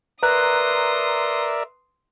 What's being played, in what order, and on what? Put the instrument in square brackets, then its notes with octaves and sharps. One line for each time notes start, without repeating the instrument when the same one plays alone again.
[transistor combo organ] A#4 D5 E5 [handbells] B4 A#5 F#6 [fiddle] C6 D#6